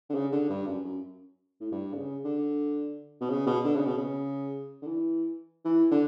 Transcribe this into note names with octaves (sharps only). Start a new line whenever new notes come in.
D3
C#3
D3
G2
F#2
F#2
A2
G2
D3
C#3
D3
B2
C#3
B2
D3
C#3
B2
C#3
D3
E3
E3
D3